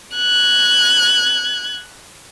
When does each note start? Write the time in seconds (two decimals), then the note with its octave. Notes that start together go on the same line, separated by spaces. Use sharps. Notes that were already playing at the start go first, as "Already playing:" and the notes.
0.16 F#6 G#6